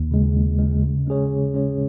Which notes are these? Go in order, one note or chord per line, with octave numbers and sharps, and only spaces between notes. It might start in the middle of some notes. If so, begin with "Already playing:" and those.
Already playing: D#2
C#3 G#3
D#2
C#3 G#3
C#3
G#3 C#4 G#4 C#5
C#3
G#3 C#4 G#4 C#5